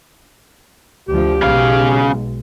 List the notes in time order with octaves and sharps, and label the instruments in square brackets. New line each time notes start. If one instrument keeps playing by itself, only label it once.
[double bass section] D2 F3 [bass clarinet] G4
[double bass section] B1 G#3 [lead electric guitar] C#3 F5